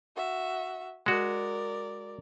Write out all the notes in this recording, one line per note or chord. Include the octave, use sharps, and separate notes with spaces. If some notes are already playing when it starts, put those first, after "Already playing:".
F#4 E5
G#3 F#4 A#4 D5